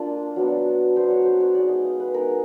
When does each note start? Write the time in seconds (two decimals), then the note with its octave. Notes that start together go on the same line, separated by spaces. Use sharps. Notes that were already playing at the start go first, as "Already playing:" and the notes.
Already playing: A#3 D4 F4
0.36 F#3 B3 D4
0.96 F#3 B3 D4 C5
1.10 C#5
1.22 B4 C5
1.40 C#5
1.54 G#3 B3 D#4 D5
1.69 D#5
1.84 F5
2.00 B4
2.14 G#3 B3 D#4 A#4